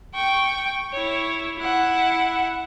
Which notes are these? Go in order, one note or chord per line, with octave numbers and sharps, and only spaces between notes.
G5 C#6
E4 C#5
E4 F#5